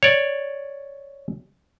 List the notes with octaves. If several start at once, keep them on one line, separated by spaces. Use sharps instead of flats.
C#5 D5